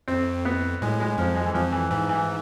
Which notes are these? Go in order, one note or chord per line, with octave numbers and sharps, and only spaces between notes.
F2 C4
B3
A2 G#3
G#3
F2 F3
G#3
E3
F2 F3
E3
G#2 E3
E3